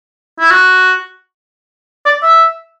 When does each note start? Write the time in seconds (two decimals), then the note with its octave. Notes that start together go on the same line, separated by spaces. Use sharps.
0.39 E4
0.51 F#4
2.06 D5
2.23 E5